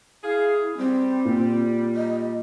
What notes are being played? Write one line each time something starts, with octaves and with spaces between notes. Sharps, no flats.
E4 G#4 F5
G3 C4
A#2
D#5